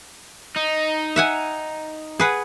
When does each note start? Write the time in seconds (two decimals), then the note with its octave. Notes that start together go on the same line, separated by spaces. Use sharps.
0.56 D#4
1.16 E5 F#5 G#5
2.20 G#4 B4 F#5